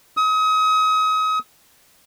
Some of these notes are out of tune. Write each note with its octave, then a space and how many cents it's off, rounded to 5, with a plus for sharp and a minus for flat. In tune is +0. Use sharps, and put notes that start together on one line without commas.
D#6 +35